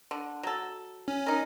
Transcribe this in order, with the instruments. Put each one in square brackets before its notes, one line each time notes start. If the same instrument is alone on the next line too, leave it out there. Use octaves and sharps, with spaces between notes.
[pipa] D3
F#3 A4
[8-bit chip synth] C#4
[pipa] D#4 A#4